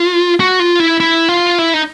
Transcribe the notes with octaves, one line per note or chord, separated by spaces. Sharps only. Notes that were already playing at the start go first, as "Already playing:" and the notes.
Already playing: F4
F#4
F4
E4
E4
F4
E4
D#4